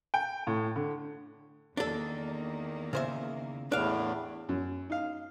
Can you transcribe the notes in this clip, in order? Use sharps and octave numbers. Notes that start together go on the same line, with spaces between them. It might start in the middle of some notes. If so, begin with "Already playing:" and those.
G5
A2
D3
E2 D#3 A#3 D4 A4
C#3 C5 E5
E2 A2 D4 F5
F#2
D#4 F5